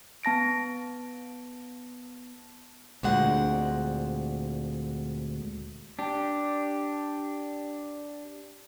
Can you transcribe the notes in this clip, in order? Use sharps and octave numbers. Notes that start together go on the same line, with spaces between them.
B3 A5 A#6 D7
D2 A#2 G#3 C4 D4 F#5
D4 G4